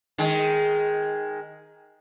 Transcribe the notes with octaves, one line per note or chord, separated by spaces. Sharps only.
D#3 G#3